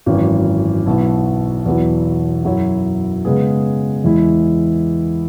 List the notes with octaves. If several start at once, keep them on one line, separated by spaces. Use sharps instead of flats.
G#1 F#2 E3 C#4
B1 B2 B3 E4
E2 B2 F#3 E4
F#2 F#3 E4 C#5
C#3 G#3 B3 G#4
E2 E3 G#3 E4